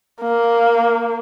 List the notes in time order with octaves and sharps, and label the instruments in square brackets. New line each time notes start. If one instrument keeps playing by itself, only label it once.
[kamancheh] A#3